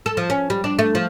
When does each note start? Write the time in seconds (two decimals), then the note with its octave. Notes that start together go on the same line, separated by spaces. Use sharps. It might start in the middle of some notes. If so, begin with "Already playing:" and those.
0.06 A4
0.17 F3
0.30 C#4
0.50 G3
0.64 D4
0.79 A3
0.95 F3